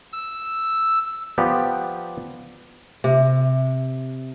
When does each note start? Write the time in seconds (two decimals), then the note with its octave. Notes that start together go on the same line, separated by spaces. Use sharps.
0.12 E6
1.38 F3 B3 G4 D5
3.04 C3